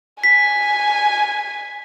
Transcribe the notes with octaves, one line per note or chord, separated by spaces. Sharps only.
G#5 B6